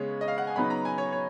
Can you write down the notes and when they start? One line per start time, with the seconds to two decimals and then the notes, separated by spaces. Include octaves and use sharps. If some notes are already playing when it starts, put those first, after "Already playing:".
Already playing: C#3 G#3 B3 C#5
0.21 D#5
0.28 F5
0.38 F#5
0.47 G#5
0.56 C#3 F#3 B3 D#4 B5
0.70 A#5
0.85 G#5
0.98 C#5
1.12 C#5